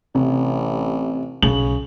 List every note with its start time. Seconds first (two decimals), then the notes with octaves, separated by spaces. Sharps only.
0.15 A1 C3
1.43 B1 C#3 F#7